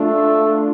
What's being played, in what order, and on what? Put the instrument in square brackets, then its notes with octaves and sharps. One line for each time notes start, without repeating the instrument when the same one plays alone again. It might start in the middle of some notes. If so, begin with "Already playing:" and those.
Already playing: [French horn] A3 [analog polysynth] D4 F4